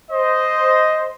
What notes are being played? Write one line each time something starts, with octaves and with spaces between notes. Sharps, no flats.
C5 D#5